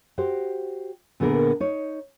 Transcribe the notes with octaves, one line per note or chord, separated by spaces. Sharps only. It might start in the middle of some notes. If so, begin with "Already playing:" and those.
F#4 G4 C5
A#2 D3 B3 G#4 A#4
D#4 C#5